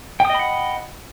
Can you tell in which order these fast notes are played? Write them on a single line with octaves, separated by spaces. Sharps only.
G5 D#6 D#5 B5 F#5